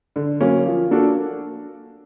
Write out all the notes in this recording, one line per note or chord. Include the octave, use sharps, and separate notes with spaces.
D3
F#3 A#3 C#4
F3
A#3 D4 F#4 A4